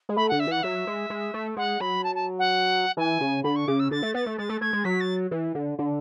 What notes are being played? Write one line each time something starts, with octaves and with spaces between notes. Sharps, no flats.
G#3
A3 B5
D3 F#5
E5
E3 F#5
F#3 E5
G#3
G#3
A3
G#3 F#5
F#3 B5
A5
A5
F#5
E3 G#5
C#3
D3 B5
C#6
C#3 D6
E6
D3 A6
A3
B3 A6
A3
G#3 A6
A3
A3 G#6
G#3
F#3 B6
A6
E3
D3
D3